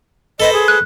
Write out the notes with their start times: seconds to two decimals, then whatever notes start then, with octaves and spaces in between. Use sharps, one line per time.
0.40 A4 B4 C5 D#5
0.53 G#4
0.68 F#6